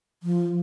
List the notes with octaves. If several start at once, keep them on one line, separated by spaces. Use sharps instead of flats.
F3